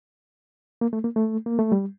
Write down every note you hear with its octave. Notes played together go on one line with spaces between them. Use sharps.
A#3
A3
A#3
A3
A#3
A3
G3